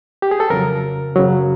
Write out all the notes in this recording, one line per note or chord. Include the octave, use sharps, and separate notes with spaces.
G4
G#4
A4
F2 C#3 F#3 A#4
F#2 C#3 F#3